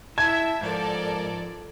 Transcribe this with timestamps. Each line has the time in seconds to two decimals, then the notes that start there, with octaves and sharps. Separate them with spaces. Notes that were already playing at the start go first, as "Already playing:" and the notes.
0.18 E4 E5 A5 G#6
0.61 G#2 F3 A4 A#4 D5